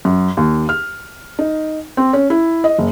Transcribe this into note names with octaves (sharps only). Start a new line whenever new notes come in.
F#2
D#2
F6
D#4
C4
C#4
E4
D#5
F#1